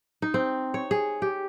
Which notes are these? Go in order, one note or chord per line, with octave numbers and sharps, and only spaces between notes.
D#4
C4
C#5
G#4
G4